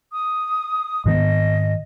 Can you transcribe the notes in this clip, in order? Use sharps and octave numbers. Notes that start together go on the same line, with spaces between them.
D#6
G#2 D#3 B3 D#5